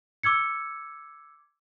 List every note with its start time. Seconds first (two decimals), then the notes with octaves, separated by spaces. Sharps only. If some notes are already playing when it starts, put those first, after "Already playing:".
0.23 D6 E6 G#6 C#7